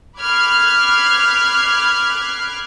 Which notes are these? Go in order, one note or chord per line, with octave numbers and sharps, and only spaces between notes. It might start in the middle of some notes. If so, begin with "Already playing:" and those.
B5 D6 F6 F#6 G#6 C7